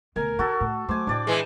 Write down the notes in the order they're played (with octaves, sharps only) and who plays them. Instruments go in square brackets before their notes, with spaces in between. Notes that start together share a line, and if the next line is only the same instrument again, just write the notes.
[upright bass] D2 B2 [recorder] A#4 [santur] G#5
[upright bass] D#3 [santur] F#4 A4
[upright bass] A2
[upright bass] F#3 A3 [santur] C5 G#5 [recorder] D6
[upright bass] A2 [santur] D4 D5 G5
[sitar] E3 G#3